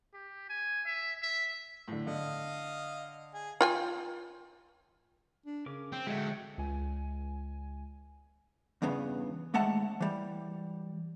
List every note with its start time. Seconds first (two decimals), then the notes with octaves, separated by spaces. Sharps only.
0.14 G4
0.49 G#5
0.86 E5
1.22 E5
1.88 A2 D3
2.07 D3 D#5 F5
3.34 G#4
3.61 F4 G5 G#5
5.46 D4
5.66 C#3 C#4 A#4 D6
5.92 C4
6.07 D3 F#3 G#3 A3 E5 G5
6.58 C#2 G#5
8.82 E2 G2 C#3 B3
9.54 D#2 G#3 A3 F#5 A5
10.01 E3 G3